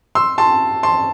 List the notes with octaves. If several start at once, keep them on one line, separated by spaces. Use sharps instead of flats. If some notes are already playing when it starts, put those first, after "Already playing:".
C6 E6
A5 C6
A5 C6